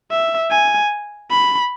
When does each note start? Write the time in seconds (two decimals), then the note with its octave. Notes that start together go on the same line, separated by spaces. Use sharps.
0.11 E5
0.51 G#5
1.31 B5